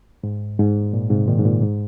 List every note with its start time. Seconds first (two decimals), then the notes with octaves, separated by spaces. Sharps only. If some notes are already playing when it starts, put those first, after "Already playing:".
0.24 G#2
0.59 G#2
0.93 A#2
1.10 G#2 C3
1.28 A#2 D#3
1.39 G#2
1.45 A#2
1.62 G#2